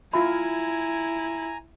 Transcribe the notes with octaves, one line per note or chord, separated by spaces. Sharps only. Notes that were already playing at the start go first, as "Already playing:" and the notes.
E4 F4 E5 G#5 A#5 B5